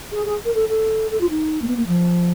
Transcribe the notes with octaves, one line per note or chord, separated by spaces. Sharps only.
G#4
G#4
A#4
A4
A4
A4
F4
D#4
A#3
B3
A#3
F3